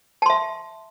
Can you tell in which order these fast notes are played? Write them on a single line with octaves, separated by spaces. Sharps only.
A5 C6 E5